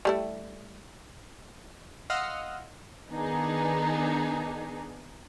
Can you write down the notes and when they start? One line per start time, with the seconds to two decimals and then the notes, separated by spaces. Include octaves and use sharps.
0.05 G3 A3 E4
2.10 D#5 F5 F#5 C6 E6 F6
3.09 D#3 B3 D4 D#4 G#4